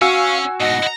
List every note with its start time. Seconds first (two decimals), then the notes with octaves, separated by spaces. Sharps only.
0.02 C#4 F#4 F5 G#5 C#6 E6
0.60 G#2 B2 D#5 F#5 A#6
0.83 E4 A#5